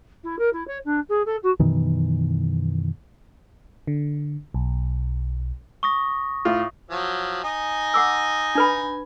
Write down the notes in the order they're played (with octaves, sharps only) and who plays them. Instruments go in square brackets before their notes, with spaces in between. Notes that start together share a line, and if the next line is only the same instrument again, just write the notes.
[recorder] E4
A#4
E4
C#5
D4
G#4
A4
F#4
[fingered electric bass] F#2 B2 D#3 E3
[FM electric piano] D3
B1
[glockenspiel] C#6 D#6 A#6
[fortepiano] A2 F4
[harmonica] F3 F#3
D#4 D#5 G#5
[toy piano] F#5 D6 E6
D4 B4 B5